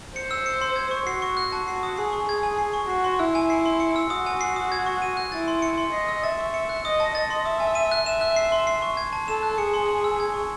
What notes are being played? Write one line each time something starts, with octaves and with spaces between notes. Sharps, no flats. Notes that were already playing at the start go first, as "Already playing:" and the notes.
C5 C#7
E6
C#7
C6
G#6
C#6
F#4 C7
C#6
F#6
A5
F#4 C7
D#6
G#4 C7
C#6
G#4 G#6
G#5
C7
C#6
F#4 C7
C6
E4 E6
G#5
C7
C6
C#7
E6
F#4 D#6
G#5
C7
D#6
G#6
C#6
D#7
F#6
E4 A6
C6
C#7
C6
D#5 C7
E6
E5 A6
C#6
C#7
F#6
D#5 D#6
A5
D#5 A6
C6
E5 D#6
G#5
D#7
F#6
E5 E7
F#6
C7
C6
C7
C#6
G#6
A5
A4 E7
F#6
G#4 C#7
C6
F#7
E6
G#6
C#6